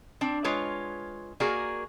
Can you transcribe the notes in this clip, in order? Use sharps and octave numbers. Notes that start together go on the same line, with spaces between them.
C4 D4
G#3 F4 B4 C#5
A#3 F#4 G#4 A#4 D5